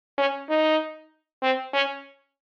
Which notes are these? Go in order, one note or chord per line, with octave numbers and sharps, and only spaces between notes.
C#4
D#4
C4
C#4